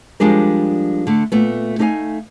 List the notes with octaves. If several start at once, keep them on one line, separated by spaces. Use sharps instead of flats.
F3 G3 G#3 D4 A#4
D3 A3
A#2 A3 B3
A3 D#4 A4 D5 F5 G#5